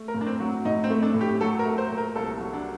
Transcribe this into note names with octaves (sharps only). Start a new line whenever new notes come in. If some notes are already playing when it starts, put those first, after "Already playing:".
Already playing: A3
A#4
A2
D4
C4
F#3
A2 D#4
C4
A3
D4
A2
G4
F#3 A4
A#4
A3
C5
A#2
A#4
C2 A4
F#3
D4